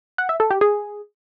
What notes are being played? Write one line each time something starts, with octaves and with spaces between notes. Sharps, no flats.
F#5
E5
A4
G4
G#4